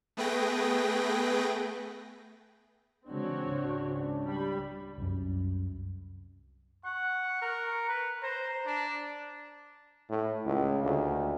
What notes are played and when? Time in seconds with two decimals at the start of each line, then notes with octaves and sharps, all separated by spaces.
0.17 A3 B3 G#4 B4 G5 A#6
3.07 C#3 E3 G#3 C4 D4 F#4 C#5
3.47 C#2 G#2 C#3
4.25 G3 B5
4.98 C2 F#2
6.85 F#5 C#6
7.42 A#4
7.89 B4
8.23 C5 A#5
8.66 D4
10.10 A2
10.45 C#2
10.83 D2